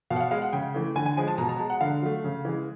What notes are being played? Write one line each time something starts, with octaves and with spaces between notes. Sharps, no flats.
B2 F5
F#5
F5
G#3 F5
F#5
C#3 G5
E3 A3
D3 G#5
G#5
F3 G#3 G#5
A5
B2 A#5
A#5
G#3 A5
F#5
D3 F5
F#3 A3
C#3
E3 G#3